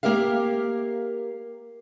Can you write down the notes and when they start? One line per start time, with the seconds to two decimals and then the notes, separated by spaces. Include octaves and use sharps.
0.03 A#3 G4 A#4 E5 F5